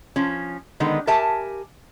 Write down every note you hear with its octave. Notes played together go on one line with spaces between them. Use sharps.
F3 C#4
D3 D#3 G#3 B3
G4 A#4 E5 G#5 A5